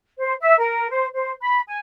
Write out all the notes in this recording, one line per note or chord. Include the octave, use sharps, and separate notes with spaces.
C5
E5
A#4
C5
C5
B5
G#5